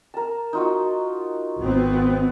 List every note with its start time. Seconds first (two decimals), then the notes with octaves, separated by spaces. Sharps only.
0.14 A#4 A5
0.53 D#4 F4 F#4
1.60 G#1 B3 C4